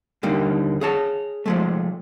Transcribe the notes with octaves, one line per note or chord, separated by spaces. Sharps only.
D#2 D3 G3 A#3
G#4 C#5 A5
F3 G#3 A3